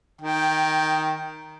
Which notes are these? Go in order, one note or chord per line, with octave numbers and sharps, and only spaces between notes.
D#3 G5